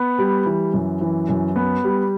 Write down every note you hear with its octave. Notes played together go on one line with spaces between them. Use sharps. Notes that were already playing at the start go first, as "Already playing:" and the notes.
Already playing: B3
G3
E3
F#2
E3
F#2
B3
G3